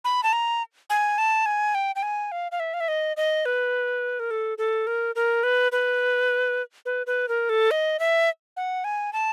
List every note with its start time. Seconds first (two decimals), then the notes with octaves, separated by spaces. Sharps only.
0.05 B5
0.23 A5
0.33 A#5
0.90 G#5
1.18 A5
1.46 G#5
1.75 G5
1.96 G5
2.03 G#5
2.32 F5
2.52 F5
2.60 E5
2.74 F5
2.80 E5
2.88 D#5
3.17 D#5
3.46 B4
4.20 A#4
4.31 A4
4.58 A4
4.87 A#4
5.15 A#4
5.43 B4
5.72 B4
6.86 B4
7.07 B4
7.28 A#4
7.49 A4
7.71 D#5
7.99 E5
8.57 F#5
8.84 G#5
9.13 A5